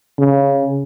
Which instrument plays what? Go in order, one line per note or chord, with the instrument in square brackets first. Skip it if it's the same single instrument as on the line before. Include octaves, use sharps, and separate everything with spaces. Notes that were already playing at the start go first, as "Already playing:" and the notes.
[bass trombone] C#3